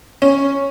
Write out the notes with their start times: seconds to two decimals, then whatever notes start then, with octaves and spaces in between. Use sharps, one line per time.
0.22 C#4